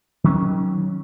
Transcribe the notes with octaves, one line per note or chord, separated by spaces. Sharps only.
D#3 F#3 C#4